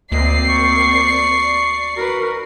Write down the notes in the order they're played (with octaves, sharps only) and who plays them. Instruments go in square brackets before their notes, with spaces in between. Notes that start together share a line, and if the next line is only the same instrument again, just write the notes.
[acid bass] D2 [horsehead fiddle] A#3 C4 [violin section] D5 C7 [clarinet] D#5
[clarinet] C#6
[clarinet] F#4 [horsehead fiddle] A#4 B4